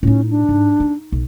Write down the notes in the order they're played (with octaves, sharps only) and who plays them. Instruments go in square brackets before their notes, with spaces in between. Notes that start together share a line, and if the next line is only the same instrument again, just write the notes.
[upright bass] A2 D#4 [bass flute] C#4
[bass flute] D4
[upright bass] G#2
D#4
B1